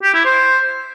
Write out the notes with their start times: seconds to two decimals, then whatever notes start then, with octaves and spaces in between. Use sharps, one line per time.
0.03 G4
0.14 E4
0.25 C5